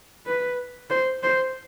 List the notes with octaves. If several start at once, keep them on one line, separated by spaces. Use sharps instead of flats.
B4
C5
C5